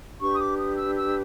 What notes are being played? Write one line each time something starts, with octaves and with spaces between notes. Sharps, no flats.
D4 G4 B4 C#6
D#6
D6
D#6
E6
E6